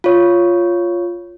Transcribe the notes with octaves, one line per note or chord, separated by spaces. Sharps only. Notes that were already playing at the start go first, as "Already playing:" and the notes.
F4 C#5